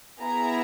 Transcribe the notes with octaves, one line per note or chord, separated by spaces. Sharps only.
B3 E4 G#4 A#5